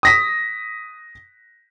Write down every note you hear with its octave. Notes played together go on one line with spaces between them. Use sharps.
D#6 A#6 B6